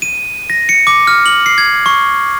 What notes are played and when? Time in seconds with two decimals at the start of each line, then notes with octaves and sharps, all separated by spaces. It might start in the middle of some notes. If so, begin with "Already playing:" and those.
0.02 D#7
0.50 A#6
0.69 C#7
0.87 D6
1.07 F6
1.26 F#7
1.46 C7
1.58 G#6
1.86 C#6